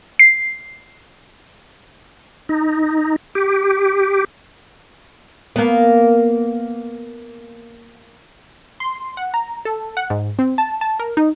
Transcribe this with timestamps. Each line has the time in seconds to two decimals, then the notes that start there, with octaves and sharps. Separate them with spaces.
0.19 C7
2.49 D#4
3.35 G4
5.56 A#3 B3
8.80 C6
9.17 F#5
9.34 A#5
9.65 A4
9.97 F#5
10.10 G#2
10.39 C4
10.58 A5
10.81 A5
10.99 A#4
11.17 D#4